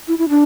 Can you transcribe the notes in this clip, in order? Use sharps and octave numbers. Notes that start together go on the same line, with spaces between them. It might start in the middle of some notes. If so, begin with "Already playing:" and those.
E4
E4
D4